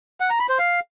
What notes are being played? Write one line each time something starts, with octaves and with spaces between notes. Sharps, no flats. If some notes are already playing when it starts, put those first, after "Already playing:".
F#5
A#5
B5
C5
F5